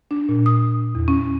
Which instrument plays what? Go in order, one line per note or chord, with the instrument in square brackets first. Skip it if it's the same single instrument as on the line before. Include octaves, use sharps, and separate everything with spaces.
[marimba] D4
A#2
D#6
E2
C#4